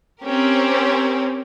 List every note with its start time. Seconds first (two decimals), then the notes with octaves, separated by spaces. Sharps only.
0.23 C4 C#4 G4 A#4